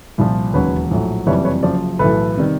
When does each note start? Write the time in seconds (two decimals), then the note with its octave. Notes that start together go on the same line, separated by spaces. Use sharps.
0.18 C2 A#2 F3
0.54 E1 D#2 C#3 F#3 B4 C#5
0.91 A#1 A2 F#3
1.27 F#1 F2 C3 E3 G3 B4 C#5
1.44 B4 C#5
1.63 F#1 F#2 C#3 F3 C5 D5
1.99 B1 A2 E3 A4 B4
2.37 C3 D#3 G3